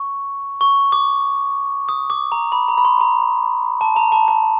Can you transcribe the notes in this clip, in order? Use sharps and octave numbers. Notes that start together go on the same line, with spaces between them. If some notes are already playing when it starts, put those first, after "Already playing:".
Already playing: C#6
C#6
D6
D#6
D6
A#5
B5
A#5
B5
C6
A#5
A5
A#5
A5
A5